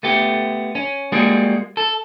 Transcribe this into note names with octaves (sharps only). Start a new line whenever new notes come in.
A3 B3 G4
C#4
G3 G#3 A#3 F#4 G#4
A4